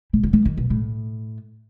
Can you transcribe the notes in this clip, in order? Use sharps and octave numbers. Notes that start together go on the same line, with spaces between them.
B2
C#3
D#3
D#3
B2
A2